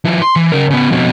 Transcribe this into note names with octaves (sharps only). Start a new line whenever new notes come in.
F3 E4
C6
E3
C#3 A#4
C#3 B3
F2 B2